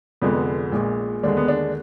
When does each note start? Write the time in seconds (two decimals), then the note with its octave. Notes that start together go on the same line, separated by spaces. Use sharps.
0.22 F1 F2 D3 G#3 B3
0.72 A#1 A#2 G#3
1.23 D#2 D3 G#3 D4
1.37 B3
1.48 D4